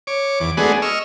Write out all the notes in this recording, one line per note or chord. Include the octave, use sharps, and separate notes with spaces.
C#5 D6
E2 D6
G#3 A3 B3 D4 F#4 G#4
D#5 C#6 E6 F6